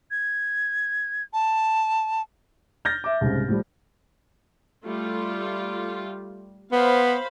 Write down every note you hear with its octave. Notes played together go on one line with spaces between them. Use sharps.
G#6
A5
F6 G6 A6 A#6
E5 D6
C2 G#2 C#3
A2 F3 G3
G3 A3 F4
B3 C5 F5 B5